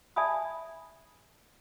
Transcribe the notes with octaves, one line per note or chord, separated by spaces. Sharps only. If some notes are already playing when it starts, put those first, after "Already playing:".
D5 E5 G#5 A5 B5 D#6